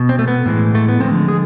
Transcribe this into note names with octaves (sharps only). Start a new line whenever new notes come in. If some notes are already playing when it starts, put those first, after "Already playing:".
Already playing: B2
C4
A3
B3
A2 E3 G#3
A3
B3
D3 F3 G#3 C4
G#4